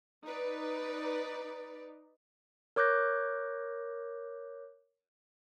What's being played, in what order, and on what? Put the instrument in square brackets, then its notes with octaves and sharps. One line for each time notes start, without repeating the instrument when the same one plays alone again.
[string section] D#4 B4 D5
[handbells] A#4 C#5 D6 F#6 G6 A#6